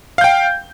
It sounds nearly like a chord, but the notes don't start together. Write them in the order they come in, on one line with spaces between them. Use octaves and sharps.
F5 G6 G5